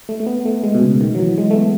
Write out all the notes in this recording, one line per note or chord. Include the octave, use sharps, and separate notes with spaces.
A3
A3
B3
A3
G#3
B2
C#3
D#3
F#3
E3
G#3
A3
B3